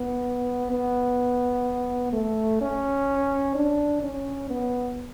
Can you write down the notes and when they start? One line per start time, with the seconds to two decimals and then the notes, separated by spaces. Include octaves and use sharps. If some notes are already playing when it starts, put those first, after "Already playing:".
Already playing: B3
0.71 B3
2.13 A3
2.61 C#4
3.55 D4
4.03 C#4
4.50 B3